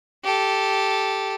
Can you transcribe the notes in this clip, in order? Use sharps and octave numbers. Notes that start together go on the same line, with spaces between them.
G4 A4